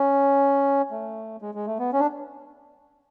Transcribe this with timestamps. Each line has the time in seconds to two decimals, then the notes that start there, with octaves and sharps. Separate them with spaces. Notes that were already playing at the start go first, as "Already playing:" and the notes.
Already playing: C#4
0.91 A3
1.42 G#3
1.55 G#3
1.67 A3
1.79 B3
1.93 C#4
2.00 D4